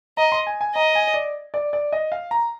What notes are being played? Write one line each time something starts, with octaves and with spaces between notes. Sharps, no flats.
D#5 A#5
C6
G#5
G#5
D#5 A#5
G#5
D5
D5
D5
D#5
F5
A#5